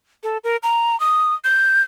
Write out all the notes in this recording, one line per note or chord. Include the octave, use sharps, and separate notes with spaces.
A4
A#4
A#5
D#6
G6